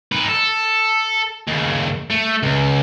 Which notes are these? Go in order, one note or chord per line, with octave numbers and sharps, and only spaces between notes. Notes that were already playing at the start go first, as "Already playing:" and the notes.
D#4 B4
A4
D#2 C#3
A3
C#2